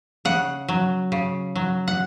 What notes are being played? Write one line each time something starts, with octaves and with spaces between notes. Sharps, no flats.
C#3 F#5
F#3
C#3
F#3
F#5